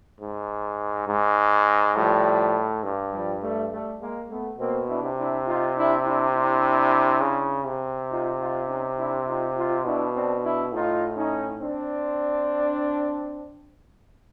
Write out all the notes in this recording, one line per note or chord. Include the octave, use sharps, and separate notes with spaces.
G#2
G#2
A2 F3 G3
G2
F3 G3
G3 A3
G3 A3
G#3 A#3
A3 B3
B2 A#3 C4
D4 E4
C3
D4 E4
D#4 F4
D4 E4
D4 E4
D4 E4
C#3
C3
D#4 F4
D#4 F4
C#4 D#4
D4 E4
D#4 F4
D#4 F4
B2 D4 E4
C4 D4
D4 E4
A2 D#4 F4
C#4 D#4
C4 D4